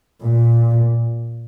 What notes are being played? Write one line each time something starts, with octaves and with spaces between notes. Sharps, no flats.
A#2